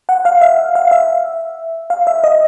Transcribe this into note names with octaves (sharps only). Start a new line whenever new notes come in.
F#5
F5
E5
F5
E5
F5
E5
D#5